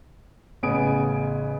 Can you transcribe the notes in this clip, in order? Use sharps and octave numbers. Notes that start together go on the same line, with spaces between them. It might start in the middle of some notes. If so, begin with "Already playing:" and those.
A1 C#3 B3 G#5 D#6 D7